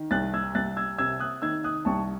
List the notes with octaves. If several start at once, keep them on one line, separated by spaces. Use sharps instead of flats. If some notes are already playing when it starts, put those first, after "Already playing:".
Already playing: D#3
C2 F#6 A6
E6 G#6
C2 F#6 A6
E6 G#6
C3 E6 G#6
D#6 F#6
D#3 E6 G#6
D#6 F#6
C2 A5 C#6